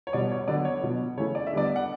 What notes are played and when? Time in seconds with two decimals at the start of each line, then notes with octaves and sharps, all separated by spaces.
0.07 C#5
0.13 B2 G3 B3 D5
0.31 C#5
0.48 D3 F#3 B3 D5
0.65 C#5
0.83 B2 F#3 B3
1.17 C#3 E3 A3 C#5
1.35 D5
1.47 E5
1.53 D3 G3 B3 D5
1.76 F#5